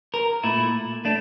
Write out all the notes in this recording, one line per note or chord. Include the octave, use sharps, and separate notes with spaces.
A#4
A#2 A3 E4
A3 D4